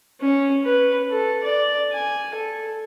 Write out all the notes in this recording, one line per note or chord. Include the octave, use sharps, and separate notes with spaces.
C#4
B4
A4
D5
G#5
A4